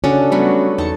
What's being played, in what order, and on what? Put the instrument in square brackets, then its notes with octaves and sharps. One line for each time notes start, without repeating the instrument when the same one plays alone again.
[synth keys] C#3 [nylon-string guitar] C#4 [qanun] D4 F#4 A4
[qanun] F#3 A3 B4 [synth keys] G3 B3 F#4
[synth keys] E2 C#7 [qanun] D#4 A5